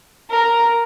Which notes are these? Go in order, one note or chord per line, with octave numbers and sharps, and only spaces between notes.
A#4